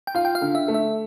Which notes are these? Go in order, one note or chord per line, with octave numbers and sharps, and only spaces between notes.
G5
F4 F5
G5
F5
D3
E5
A3
E5